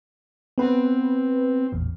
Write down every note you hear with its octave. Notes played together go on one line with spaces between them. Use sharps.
B3 C4 B4
A1 E2 A#2